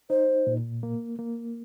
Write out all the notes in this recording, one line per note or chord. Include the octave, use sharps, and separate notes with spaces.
D#4 C5
A#2
A#3
A#3